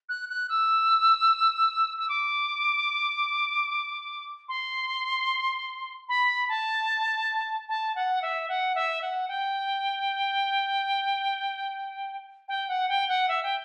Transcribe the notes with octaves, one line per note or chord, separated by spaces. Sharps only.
F#6
F#6
E6
E6
D6
C6
B5
A5
A5
F#5
E5
F#5
E5
F#5
G5
G5
F#5
G5
F#5
E5
G5